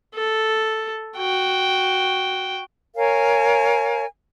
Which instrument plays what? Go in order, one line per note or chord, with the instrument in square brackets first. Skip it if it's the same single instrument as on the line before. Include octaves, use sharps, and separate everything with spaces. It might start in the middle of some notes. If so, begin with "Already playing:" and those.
[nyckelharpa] A4
F#4 G5
[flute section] A#4 C#5 F5 G#5